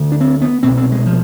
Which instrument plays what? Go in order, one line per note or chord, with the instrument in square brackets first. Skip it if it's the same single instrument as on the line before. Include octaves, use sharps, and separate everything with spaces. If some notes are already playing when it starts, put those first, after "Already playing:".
Already playing: [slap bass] D2 D3
D4
C4
B3
C2 B2 C4
C4
G#3
F3